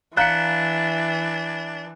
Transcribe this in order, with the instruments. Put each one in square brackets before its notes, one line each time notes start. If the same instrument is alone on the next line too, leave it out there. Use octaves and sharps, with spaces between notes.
[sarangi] E3 [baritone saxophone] D4 [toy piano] F5 G5 A#5 [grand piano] F#6 B6 C#7